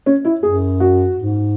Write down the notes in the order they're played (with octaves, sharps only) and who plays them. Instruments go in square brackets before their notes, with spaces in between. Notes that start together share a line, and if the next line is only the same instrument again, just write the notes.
[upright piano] C#4
E4
[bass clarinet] F#2 [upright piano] G#4
[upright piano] F#4
[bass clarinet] G#2